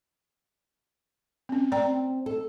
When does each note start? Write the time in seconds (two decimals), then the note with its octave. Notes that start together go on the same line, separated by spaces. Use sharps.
1.49 C4 C#4
1.72 C4 D5 G5 A#5
2.26 A4